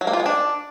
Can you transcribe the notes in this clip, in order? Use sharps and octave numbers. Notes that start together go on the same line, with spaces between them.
F#3
A#3
F4
G#3
D4